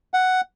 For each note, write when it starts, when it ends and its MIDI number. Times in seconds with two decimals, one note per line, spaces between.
0.14 0.41 78